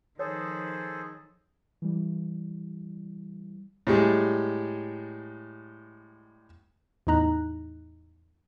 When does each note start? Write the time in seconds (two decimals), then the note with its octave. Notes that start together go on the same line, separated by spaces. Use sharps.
0.19 D#3 F3 G#4 A4 C5 C#5
1.82 E3 G3
3.87 A2 G3 G#3
7.07 E2 A2 D#4 A#5 F#6